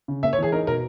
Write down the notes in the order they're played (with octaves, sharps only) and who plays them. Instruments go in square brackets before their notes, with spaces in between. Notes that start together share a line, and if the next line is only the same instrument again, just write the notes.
[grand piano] C#3
[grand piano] A#3 [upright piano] E5
[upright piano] C#5
[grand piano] E3 [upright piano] G#4
[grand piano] D#4 [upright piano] A#4
[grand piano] B2 [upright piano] A#4